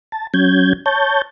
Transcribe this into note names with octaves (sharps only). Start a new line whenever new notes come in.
A5
F#3 C#4 G6 G#6
C#5 A5 G6